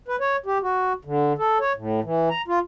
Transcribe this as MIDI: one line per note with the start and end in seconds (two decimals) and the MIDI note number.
0.08 0.16 71
0.20 0.36 73
0.46 0.58 67
0.63 0.93 66
1.05 1.33 50
1.38 1.58 69
1.60 1.72 73
1.77 2.00 45
2.04 2.29 52
2.30 2.42 82
2.48 2.59 65